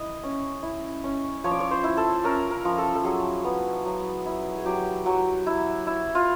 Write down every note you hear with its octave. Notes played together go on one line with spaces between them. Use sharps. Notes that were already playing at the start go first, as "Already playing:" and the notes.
Already playing: E4 D#5
C#4
E4
C#4
F3 C#5
D5
C#5
C5
E4
A4
C#4 A#4
A#4
F3
A4
A4
F#3 G#4
B3
F#3
E4
G#4
F#3 G4
F#3
E4
E4
F4